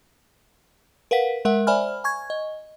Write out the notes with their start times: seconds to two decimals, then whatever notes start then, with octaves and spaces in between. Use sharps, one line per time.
1.11 A#4 B4 F5 F#5 B6
1.45 G#3 A#4 E5 F#5
1.67 C5 D5 E5 G#5 B5 F6
2.04 G#5 C#6 G#6
2.30 D#5